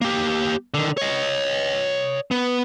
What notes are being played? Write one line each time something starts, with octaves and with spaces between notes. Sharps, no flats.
A#3 G4
D3 D#3
C#5 D#5
B3